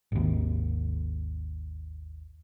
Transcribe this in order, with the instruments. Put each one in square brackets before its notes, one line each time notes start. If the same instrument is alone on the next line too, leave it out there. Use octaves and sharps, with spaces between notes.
[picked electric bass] G#1 D#2